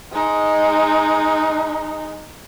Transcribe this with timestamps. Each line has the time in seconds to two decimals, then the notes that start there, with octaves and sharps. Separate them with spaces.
0.12 G#3 D#4